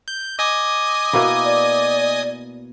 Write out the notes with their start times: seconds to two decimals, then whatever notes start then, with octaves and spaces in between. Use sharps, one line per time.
0.08 G6
0.39 D#5 G#5 D6 D#6
1.13 B2 A#3 E4
1.45 D5